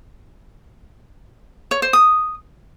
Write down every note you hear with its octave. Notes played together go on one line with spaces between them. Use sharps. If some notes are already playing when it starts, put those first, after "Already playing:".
C#5
C5
D#6